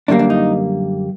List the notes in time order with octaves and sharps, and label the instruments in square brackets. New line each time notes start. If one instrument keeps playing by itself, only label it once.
[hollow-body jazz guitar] F#2 D3 G3 A#3 D4
D4
D#4